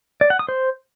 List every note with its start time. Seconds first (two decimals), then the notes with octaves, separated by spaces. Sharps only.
0.21 D5
0.30 F#5
0.39 D#6
0.49 C5